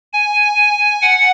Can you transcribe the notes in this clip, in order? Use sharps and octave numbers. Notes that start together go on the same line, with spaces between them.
G#5
F#5